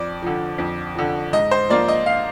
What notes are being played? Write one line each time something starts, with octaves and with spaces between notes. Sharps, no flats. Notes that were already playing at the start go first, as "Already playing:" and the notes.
Already playing: F2 D5
D3 F3
F2
D3 F3
G#2 D#5
C5
F3 A#3 F4 D5
D#5
F5